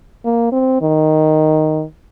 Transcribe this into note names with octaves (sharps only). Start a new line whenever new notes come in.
A#3
C4
D#3